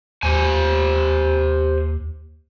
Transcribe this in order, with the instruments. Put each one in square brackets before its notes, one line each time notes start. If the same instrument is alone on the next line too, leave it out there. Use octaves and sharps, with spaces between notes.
[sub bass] D#2 [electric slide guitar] G4 C5 G#5